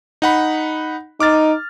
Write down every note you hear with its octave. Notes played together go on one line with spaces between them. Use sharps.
D#4 F#5 B5
D#4 D6 F6 A6